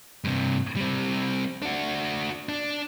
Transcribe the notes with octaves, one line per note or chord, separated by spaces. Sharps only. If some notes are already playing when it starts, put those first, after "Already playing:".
G2 C3
G3 C4
D4 F#4
D4